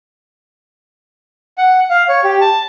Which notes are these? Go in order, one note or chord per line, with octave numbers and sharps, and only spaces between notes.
F#5
F5
C#5
G4
A5